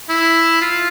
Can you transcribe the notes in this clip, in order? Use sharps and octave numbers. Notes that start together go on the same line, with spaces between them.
E4
F4